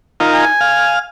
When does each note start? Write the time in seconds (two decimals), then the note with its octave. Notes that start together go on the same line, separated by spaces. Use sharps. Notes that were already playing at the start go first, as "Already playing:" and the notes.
0.20 D#4 F4 A#4
0.33 G#5
0.61 F5